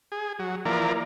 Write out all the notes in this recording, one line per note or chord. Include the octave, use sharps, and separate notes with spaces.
G#4
F#3
E3 F3 A#3 A#4 D5